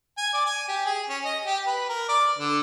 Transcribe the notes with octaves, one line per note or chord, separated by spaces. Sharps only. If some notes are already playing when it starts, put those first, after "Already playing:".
G#5
D5
G#5
G4
G#4
C#4
D#5
G4
B4
A#4
D5
D3